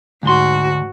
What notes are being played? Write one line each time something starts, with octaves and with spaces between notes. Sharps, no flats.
D2 G#2 F#4 C6